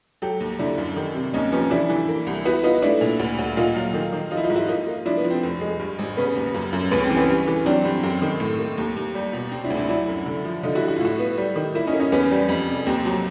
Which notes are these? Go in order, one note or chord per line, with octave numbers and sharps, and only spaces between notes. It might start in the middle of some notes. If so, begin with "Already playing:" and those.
F#3 G4 A4
D#2
D3 D4 E4
F#2
D#3
C3
D#2 C#4 D#4
F3 B3 C#4
E3 D4 E4
E3
A#3
C2
B3 E4 F#4
B3 D#4 F4
A3 D4 E4
A#2
D2
D2
A#2 D#4 F4
F#3
D#3
D#3
F3 D#4 F4
E4
D#4 F4
G#2
E4 F#4
A#3 D#4 F4
A#3
F3 D4 E4
B3
F3
C4
F1
G#3
G2
G#1
C#3 B3 C#4
D#2
F#2
F#2
C#2 B3
C#4
C4
E3
B3 C#4
G2
E3
F#3 C4 D4
G2 C4
F#2 C4
D#3
A2
A#3
D#2
D#2
G3
B2
C3 C4
D4 E4
D2
D4 E4
F#3 D4 E4
F#2
D3
F3
D3 D#4 F4
E4 F#4
D3
F#4
F4
A2 E4 F#4
B3
G3
D#3
A#3 E4
C#4 D#4
A#3
C#4 D#4
E2 B3 C#4
G3
F2
C3
D#2 C4
F#3